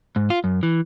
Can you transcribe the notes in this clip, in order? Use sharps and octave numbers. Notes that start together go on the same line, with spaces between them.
G#2
F4
F#2
E3